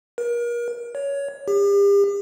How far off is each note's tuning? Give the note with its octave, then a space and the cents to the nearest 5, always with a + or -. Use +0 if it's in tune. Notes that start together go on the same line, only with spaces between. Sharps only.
A#4 +35
C#5 +15
G4 +40